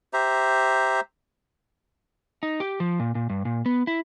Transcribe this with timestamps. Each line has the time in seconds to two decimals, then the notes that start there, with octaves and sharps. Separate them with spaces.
0.13 G4 C5 E5 A#5
2.43 D#4
2.60 G4
2.80 F3
3.00 A#2
3.15 A#2
3.30 G2
3.45 A#2
3.66 B3
3.87 E4